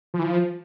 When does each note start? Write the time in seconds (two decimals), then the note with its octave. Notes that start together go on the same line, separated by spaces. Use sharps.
0.14 F3
0.19 E3
0.24 F3